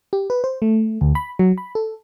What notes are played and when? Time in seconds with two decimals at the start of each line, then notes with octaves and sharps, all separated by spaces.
0.13 G4
0.30 B4
0.44 C5
0.62 A3
1.01 D2
1.15 B5
1.39 F#3
1.58 B5
1.75 A4